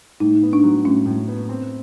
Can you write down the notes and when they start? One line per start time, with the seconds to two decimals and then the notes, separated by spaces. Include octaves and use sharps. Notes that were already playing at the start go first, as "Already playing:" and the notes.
0.20 A2 D#4
0.42 B3
0.53 D4
0.63 F#3
0.85 A2 C#4
1.06 A2
1.27 B3
1.49 C4